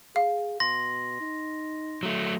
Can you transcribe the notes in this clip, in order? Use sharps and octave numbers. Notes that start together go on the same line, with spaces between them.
G#4 F5
B2 C6 A#6
D#4
F#3 A3